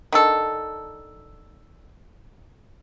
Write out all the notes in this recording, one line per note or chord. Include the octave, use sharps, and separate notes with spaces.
D#3 D4 A4